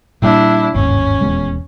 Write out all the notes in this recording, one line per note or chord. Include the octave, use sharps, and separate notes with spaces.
A#2 G3 D4 E4
G1 D#2 G#2 C#4
D#1 E2 G#3